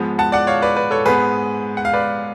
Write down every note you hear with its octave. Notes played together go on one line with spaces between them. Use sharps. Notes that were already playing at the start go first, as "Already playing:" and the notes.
Already playing: G#2 F3 G#3 B3
F#5 A5
D5 F#5
C#5 F5
B4 D5
B4 D5
A4 C#5
G#2 G#3 B3 G#4 B4
F#5
F5
B4 D5